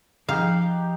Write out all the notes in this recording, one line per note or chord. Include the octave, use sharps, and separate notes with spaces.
F3 D#4 G4 F5 F#5